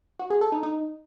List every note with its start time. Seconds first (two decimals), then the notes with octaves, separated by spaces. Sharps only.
0.19 F#4
0.30 G#4
0.41 A4
0.52 D#4
0.63 D#4